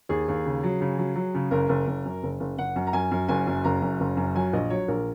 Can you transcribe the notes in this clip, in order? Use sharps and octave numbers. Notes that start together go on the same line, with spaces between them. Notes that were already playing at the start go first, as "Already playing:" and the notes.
D#2 G#4
D#2
C#3
F#3
C#3
F#3
F#3
C#3
F#1 A#4
F#1
F#1
F#2
F#1
F#1
F#1 F#5
F#2
A#5
F#2 G#5
F#2
F#1 G#5
F#2
F#1 A#5
F#2
F#1
F#2
F#3 G#5
A#1 D#5
F#3 C#5
A#1 A#4